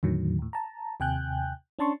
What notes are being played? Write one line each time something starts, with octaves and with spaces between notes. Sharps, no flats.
E2 A2 D3 D#3 F#3
D#2 A2
A5 A#5
D#2 C3 G5 G#5 F#6 G6
C#4 D4 A5 C6 C#6